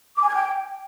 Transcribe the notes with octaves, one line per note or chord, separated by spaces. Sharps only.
D6
G#5
G#6
G5